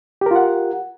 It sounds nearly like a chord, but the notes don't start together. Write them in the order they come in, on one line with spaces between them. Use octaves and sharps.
G4 A#4 F4 F#5